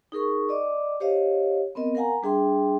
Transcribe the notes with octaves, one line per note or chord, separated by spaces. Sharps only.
D#4 G#4 A#4 C#6
D5 D#5 D6
G4 C5 C#5 D#5 F5
B3 C4 A#4 D#5
A#4 F5 F#5 G#5 A#5
G3 D4 G#4 E5 G5 C6